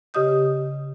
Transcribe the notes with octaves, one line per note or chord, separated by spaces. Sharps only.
C#3 G4 D#5 D#6 G6